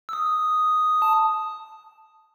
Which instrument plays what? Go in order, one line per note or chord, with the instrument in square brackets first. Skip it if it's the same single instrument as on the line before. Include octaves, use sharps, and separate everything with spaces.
[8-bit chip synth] E6
D#6
A5